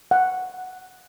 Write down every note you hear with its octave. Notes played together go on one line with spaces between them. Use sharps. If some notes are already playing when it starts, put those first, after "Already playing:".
F#5